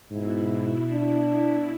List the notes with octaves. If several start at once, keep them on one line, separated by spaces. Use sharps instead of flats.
G#2 B2 E4
D4